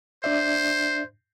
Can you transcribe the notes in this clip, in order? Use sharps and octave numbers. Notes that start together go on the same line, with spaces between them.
D4 C5 D5 E5